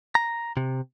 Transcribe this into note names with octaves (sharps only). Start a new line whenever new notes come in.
A#5
C3